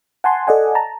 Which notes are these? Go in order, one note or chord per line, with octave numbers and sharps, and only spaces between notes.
F#5 G#5 A5 C6
A4 D5 D#5 F#5 G#5
A5 A#5